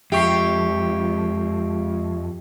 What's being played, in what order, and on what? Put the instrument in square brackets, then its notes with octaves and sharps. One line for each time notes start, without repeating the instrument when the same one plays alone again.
[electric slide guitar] F2 [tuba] G#3 [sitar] G4 [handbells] E5 C#6 C7